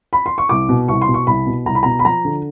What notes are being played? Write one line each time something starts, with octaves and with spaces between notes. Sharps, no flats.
B5
C6
C#6
C2 D6
B2
C2 C#6
C6
B2
C#6
C2 B5
B2
C2 A#5
B5
B2 A#5
B5
F3 A#5
D3